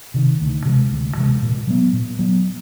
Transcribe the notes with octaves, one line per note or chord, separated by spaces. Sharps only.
C3 D#3
D2
C3 E3 G#3
D2
C3 E3 G#3
A#2
F#3 B3
A#2
F#3 B3